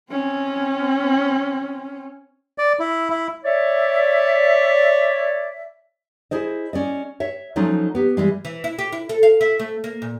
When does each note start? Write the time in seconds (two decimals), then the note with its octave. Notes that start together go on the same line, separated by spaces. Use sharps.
0.10 C4 C#4
2.58 D5
2.79 E4
3.10 E4
3.45 C#5 D5 E5
6.31 E4 G#4 C5 D#5
6.73 C#4 D5 D#5
7.20 C#5 E5
7.56 F3 F#3 A3 C#4 D#4 F4
7.95 B3 G4
8.17 E3 G3 G#3
8.45 E3
8.64 E4
8.79 G4
8.93 E4
9.09 A4
9.23 F5
9.41 E4
9.59 A3
9.84 A#3
10.02 A#2